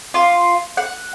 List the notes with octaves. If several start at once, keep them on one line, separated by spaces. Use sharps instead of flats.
F4
F#5